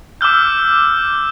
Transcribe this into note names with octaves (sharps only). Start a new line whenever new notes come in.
D6 E6 F6 G6